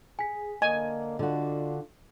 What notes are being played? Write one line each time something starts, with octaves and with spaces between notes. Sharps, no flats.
G#4 G#5 B6
D3 A#3 D#5 G#5
D3 D4 F4 F#4